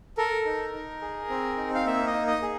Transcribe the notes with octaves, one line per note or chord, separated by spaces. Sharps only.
A4 A#4
D#4
D#4
G#4
C4
D#4
F5
A#3 E5
D#5
D#4
D#5
G#4